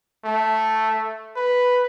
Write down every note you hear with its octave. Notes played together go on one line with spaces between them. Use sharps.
A3
B4